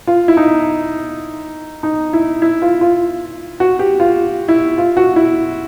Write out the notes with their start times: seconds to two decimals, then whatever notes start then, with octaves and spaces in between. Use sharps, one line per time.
0.07 F4
0.28 E4
0.37 D#4
1.83 D#4
2.13 E4
2.42 E4
2.62 F4
2.81 F4
3.60 F#4
3.79 G4
4.00 F4
4.48 E4
4.78 F4
4.97 F#4
5.16 E4